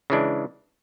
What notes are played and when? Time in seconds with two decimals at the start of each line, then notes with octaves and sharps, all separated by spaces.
0.10 C#3 E3 G#3 D4